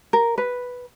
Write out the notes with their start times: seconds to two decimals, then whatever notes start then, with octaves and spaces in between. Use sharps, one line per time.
0.13 A#4
0.38 B4